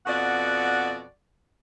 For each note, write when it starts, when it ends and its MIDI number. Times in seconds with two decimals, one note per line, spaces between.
0.06 1.03 41
0.06 1.03 47
0.06 1.03 66
0.06 1.03 74
0.06 1.03 78